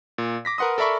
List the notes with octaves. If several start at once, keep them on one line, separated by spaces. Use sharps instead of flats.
A#2
D6 A#6 B6
A#4 B4 F#5 C6 D#6
A4 A#4 D5 E5 B5 C#6